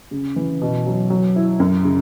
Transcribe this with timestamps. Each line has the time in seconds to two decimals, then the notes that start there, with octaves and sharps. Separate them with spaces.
0.11 C#3
0.36 E3
0.62 B2
0.86 F#3
1.10 F#3
1.36 E4
1.60 F#2
1.84 C#3